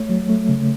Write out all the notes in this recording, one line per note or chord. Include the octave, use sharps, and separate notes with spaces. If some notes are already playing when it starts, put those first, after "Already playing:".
Already playing: A3 C#5
F#3
A3
C#3